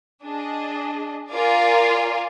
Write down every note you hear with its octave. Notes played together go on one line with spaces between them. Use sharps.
D4 G#4 D#5
F4 A#4 D5 F5 G#5